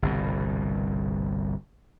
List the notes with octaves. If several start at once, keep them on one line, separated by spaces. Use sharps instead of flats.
G1 C2 B2